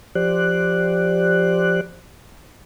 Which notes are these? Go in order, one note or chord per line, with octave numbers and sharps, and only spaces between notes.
F3 G4 C5 D5 F#6